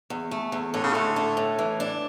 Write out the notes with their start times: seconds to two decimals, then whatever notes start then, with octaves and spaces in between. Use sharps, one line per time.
0.10 E2
0.31 A3
0.52 E2
0.73 A2 D3
0.84 C#3
0.93 D3 A3
1.16 A3
1.37 A2
1.59 E3
1.80 D4